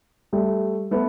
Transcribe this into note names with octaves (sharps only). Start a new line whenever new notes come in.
G3 A3
A3 B3